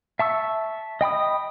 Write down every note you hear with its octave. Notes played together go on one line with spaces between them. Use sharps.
E5 A5 C#6 E6
D#5 G5 B5 D#6